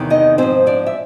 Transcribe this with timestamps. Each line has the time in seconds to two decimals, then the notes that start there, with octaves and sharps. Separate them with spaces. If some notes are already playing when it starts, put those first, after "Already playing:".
Already playing: E2 C3 D#3
0.10 D#4 D#5
0.38 G#2 F3 C4 C5
0.66 D4 D5
0.86 E5